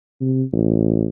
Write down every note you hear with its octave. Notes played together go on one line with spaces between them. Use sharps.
C3
A1